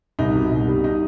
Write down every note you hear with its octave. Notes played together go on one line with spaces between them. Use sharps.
C2 D#4
B2
C2
G3
D#4